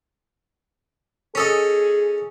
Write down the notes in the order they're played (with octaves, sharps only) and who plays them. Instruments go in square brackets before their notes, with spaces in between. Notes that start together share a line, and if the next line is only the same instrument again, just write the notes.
[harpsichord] C#4 A4 D#5 [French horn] G#4